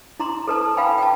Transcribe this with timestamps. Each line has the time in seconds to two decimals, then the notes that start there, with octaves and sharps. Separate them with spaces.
0.20 E4 A#5 C6
0.47 A4 B4 A5
0.77 B4 F5 G5 G#5 B5
0.98 G5 A5